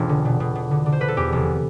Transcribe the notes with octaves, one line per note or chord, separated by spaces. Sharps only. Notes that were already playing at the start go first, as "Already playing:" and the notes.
Already playing: E1 A1 D4 F4
D3
B2
B2
B2
D3
D3
C5
D3 B4
A4
E2 G4
F1